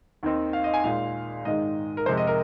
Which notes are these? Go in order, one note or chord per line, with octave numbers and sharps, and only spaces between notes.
D#2 D#3 C4 D#4
F5
D#5
G#5
A#2 G#3 D#4 F5
G#2 D#3 G#3 D#5
A#4
F2 C3 G#3 C5
D#5
A#4